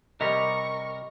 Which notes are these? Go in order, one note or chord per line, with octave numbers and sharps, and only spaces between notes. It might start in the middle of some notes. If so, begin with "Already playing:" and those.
C3 G3 A#4 D#5 B5 C#6 B6